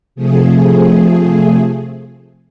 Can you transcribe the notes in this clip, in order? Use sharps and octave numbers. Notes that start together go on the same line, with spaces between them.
C3 F3 A3 G#4